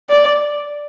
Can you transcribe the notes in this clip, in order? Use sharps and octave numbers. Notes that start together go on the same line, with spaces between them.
D5